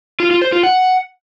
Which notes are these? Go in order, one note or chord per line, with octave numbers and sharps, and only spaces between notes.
F4
F4
C5
F4
F#5